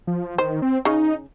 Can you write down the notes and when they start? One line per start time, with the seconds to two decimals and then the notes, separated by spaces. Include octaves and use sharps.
0.07 F3
0.38 D#3 C5
0.62 C4
0.85 C#3 D#4